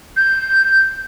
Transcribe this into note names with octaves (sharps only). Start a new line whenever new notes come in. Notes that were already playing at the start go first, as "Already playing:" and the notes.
G6